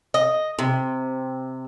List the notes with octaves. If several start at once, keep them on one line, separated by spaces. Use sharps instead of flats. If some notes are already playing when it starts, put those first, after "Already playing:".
D#5
C3